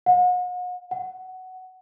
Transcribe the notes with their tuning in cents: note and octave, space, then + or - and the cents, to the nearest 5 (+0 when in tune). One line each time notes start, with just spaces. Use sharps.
F#5 -40
F#5 +10